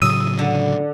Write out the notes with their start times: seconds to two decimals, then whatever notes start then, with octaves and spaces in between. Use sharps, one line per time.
0.02 A2 C#3 F#3 D#6 E6 D#7
0.39 D3